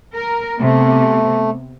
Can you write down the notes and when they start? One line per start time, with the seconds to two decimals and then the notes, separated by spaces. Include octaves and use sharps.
0.15 A#4
0.60 C3 A3 B3